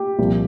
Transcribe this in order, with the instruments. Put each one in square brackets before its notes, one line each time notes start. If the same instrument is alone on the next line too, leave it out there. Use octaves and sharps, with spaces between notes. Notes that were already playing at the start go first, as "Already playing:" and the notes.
Already playing: [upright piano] G4
C2 A#2 F3